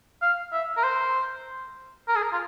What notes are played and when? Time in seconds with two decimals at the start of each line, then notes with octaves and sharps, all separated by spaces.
0.22 F5
0.53 E5
0.77 A#4
0.84 C5
2.08 A#4
2.15 G#4
2.22 A#4
2.32 F4